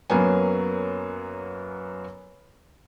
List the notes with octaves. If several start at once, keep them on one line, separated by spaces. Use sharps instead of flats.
F#2 F#3 A#3 B3 G#5